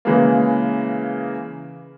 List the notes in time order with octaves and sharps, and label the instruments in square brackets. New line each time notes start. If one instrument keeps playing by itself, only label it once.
[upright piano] C#3 E3 G#3 A#3